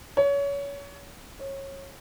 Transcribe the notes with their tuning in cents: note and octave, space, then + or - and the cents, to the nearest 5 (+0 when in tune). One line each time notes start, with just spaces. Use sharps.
C#5 +25
C#5 -25